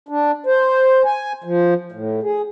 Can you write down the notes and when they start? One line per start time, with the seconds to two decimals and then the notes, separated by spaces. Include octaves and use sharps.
0.09 D4
0.46 C5
1.05 G#5
1.44 F3
1.92 A2
2.23 G#4